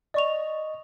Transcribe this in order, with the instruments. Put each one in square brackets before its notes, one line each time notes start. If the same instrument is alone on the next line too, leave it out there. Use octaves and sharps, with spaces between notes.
[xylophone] D5 C#6 F7 [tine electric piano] D#5